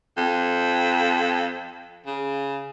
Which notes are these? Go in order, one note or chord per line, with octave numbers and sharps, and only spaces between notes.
F2
C#3